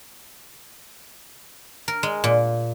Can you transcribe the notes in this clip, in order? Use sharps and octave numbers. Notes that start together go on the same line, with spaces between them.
A#4
G#3
A#2